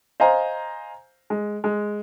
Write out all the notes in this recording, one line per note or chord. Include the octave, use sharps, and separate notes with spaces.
C5 D#5 F5 G#5 A#5
G#3
G#3